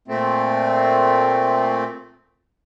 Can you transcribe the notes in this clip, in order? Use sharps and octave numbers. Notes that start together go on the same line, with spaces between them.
A#2 A3 C4